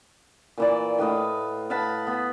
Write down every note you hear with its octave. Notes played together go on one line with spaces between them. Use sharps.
A#2 E3 D5
A2 B4 D#5 F5
F5 F#5 A5 B5
B3